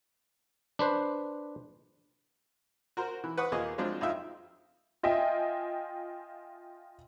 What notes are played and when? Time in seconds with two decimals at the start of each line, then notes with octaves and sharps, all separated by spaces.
0.79 D4 B4 C5
2.97 F#4 A#4 C5
3.24 E3
3.38 B4 F#5 C#6 D#6
3.52 D#2 A#2 A#3 G#4 D#5
3.78 F3 F#3 G#3 C4 D4 C5
4.01 F2 D#4 F4 E5 G5
5.03 F4 D#5 E5 G5 G#5